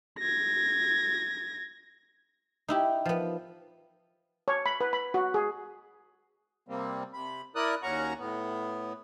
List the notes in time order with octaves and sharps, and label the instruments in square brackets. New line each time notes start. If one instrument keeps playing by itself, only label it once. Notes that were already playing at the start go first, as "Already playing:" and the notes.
[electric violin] G#6 A#6
[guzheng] D#4 E4 G4
F3 B3
[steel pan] C#5
B5
B4
B5
F#4
G#4
[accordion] C3 G3 A#3 C4
C3 B5
E4 A#4 D5 D#6 F#6
D#2 C#4 F#4 F#5 A#5 C#6
A2 B3